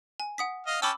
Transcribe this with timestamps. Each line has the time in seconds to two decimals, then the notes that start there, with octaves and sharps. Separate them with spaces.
0.20 G#5
0.38 F#5 D#6 B6
0.67 D#5 F5
0.82 C#4 G5 A5 B5 D6 E6